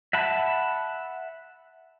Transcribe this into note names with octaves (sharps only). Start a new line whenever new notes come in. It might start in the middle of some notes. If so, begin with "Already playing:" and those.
E5 F#5 A5 B5